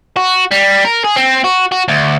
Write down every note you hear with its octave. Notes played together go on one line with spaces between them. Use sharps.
F#4
G3
A#4
G#4
C4
F#4
F#4
D2